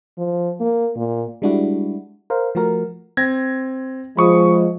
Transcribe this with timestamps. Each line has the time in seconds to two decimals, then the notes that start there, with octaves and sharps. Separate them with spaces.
0.18 F3
0.60 A#3
0.96 A#2
1.42 G3 G#3 D4 E4 F#4
2.30 A#4 C5 F5
2.55 F3 A3 F#4 A#4
3.17 C4 G#6 A#6
4.17 F3 G#3 B5 C#6 D#6